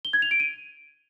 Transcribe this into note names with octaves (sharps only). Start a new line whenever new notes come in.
G7
G#6
F7
D7
D#7